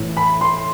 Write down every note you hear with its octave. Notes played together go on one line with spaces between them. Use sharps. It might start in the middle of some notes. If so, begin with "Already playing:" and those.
Already playing: A2 E3
B5
C6